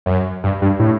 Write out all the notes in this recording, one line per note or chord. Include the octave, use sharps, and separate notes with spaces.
F#2
G2
G2
A2